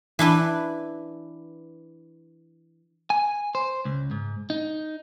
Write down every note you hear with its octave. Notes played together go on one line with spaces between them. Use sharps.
E3 D4 E4 B4
G#5
C5
C#2
G#2
D#4